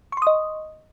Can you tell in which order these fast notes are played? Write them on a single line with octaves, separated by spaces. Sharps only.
C#6 C6 D#6 D#5